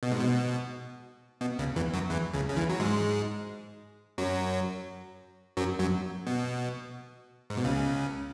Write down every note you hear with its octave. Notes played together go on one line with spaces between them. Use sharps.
B2
G#2
B2
B2
C#2 C#3
E2 E3
F#2 F#3
E2 E3
C#2 C#3
C#3
E2 E3
F#3
G#2 G#3
F#2 F#3
F#2 F#3
F#2 F#3
B2
G#2
B2
C#2 C#3